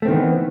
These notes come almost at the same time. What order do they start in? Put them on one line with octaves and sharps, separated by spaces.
A3 C4 D#3 B3 E3